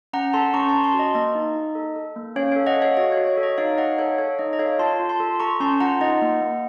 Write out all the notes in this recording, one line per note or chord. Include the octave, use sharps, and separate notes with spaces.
C#4 F#5 A#5
A4 A5 C6
C#4 A#5 C#6
A5 C6
C#4
A5 C6
F#4
D#5
A#3 D#5
D#4
D#4
A4
A4
A#3
C#4 C#5 F5
A4 C#5 F5
D#5 F#5
A4
C#5 F5
F#4 D#5
F#4 C#5
C#5
A4
D#5
D#4 C#5 F5
D#4 D#5 F#5
A4 C#5 F5
A4 C#5
D#4 D#5
D#5
A4 C#5 F5
F4 A5 C6
F4
A5 C6
A4
A4 A#5 C#6
C#4 A5 C6
F4 F#5 A#5
D#4 D#5 F#5
A#3
A#3